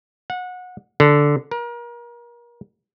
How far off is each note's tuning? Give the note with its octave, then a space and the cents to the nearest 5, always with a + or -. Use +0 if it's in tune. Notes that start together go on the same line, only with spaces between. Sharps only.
F#5 -25
D3 -5
A#4 +35